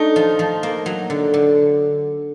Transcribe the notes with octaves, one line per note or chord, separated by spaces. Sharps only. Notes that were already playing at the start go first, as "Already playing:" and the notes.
Already playing: A3 D4 D#4
F3
F3
A#3
F#3
D3
D3